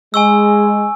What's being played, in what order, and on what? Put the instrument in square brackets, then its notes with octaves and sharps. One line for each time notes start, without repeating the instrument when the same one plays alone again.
[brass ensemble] G#3 [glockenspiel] G#5 C#6 E6